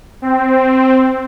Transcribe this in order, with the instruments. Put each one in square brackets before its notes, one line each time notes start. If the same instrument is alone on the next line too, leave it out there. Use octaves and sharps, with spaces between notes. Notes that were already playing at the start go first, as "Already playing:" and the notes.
[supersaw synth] C4